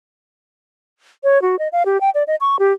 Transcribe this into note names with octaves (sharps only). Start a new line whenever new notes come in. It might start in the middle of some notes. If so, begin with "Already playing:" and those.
C#5
F#4
D#5
F5
G4
G5
D5
D#5
C#6
G4